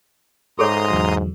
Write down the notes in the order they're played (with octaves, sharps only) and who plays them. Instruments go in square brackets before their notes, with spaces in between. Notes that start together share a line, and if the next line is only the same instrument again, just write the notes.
[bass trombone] G#2 [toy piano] G#4 A4 C#5 [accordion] A#5 C6 D#6
[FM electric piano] E2 D3 F#3